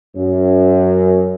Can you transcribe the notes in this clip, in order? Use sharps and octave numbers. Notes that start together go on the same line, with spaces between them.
F#2